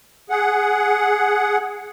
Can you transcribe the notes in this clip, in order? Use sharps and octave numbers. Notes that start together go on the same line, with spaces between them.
G#4 F#5